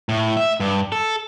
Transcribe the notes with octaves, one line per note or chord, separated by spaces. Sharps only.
A2
E5
G2
A4